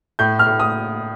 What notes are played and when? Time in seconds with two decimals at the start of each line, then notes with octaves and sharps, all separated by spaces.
0.19 A2 G6
0.39 F6
0.46 A2
0.60 D#6